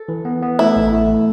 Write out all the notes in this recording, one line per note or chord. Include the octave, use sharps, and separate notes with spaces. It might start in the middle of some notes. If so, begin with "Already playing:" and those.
Already playing: A4
E3
B3
B3
A3 E4
A1
A3